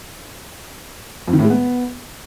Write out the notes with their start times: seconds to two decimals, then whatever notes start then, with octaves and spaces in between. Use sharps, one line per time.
1.28 F2
1.33 D#3
1.39 A2
1.45 G#3
1.50 B3